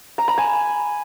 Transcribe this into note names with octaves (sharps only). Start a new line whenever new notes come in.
A#5
B5
G#5